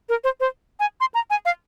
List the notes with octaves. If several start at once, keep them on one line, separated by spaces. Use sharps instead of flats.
A#4
C5
C5
G#5
C6
A#5
G#5
F5